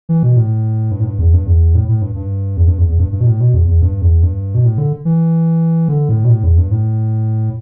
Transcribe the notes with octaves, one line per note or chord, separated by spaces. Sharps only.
E3
B2
A2
G2
A2
G2
E2
G2
E2
A2
A2
G2
G2
E2
G2
E2
E2
G2
G2
B2
A2
B2
E2
E2
G2
E2
G2
B2
A2
D3
E3
D3
A2
B2
A2
E2
G2
A2